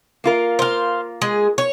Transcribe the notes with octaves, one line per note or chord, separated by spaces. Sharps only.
A#3 F4 A#4
C5 F5
G#3 G#4
C#5